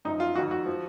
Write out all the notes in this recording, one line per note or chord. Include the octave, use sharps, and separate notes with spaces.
F#2 F3 D#4
F4
F2 D#3 F#4
F#4
F3